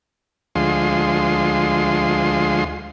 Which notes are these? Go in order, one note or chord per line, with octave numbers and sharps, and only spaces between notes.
D2 F3 G#3 C6